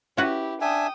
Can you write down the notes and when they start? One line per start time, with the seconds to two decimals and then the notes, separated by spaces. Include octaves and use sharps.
0.17 C#4 E4 F#4 G4 B4
0.61 D4 E5 G5 G#5 D#6